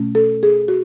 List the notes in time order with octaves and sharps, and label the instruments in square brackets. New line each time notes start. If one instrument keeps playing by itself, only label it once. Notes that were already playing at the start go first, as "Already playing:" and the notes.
Already playing: [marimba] B2 A3 C#4
A4
G#4
F#4